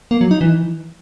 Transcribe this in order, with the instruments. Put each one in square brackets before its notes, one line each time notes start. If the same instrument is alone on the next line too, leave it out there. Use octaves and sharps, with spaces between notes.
[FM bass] A#3
F#3
D#4
E3